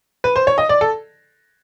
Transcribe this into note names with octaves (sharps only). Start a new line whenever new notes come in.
B4
C5
C#5
D#5
D5
A4